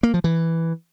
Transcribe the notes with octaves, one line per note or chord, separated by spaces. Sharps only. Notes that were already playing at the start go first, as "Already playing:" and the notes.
A#3
F3
E3